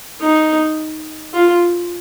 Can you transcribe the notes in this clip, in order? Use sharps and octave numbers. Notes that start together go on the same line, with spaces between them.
D#4
F4